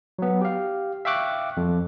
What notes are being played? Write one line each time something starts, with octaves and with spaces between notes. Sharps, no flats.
F#3 B3
G4 F5
E5 F5 G5 C#6 D6 F#6
F2